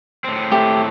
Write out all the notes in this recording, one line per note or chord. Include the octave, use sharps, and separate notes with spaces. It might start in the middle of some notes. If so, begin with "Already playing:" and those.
A2 C4
A3 G4